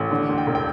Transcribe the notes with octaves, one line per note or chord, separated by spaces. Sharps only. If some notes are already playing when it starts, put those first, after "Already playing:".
Already playing: A1
D3
D2
G5
E1
G5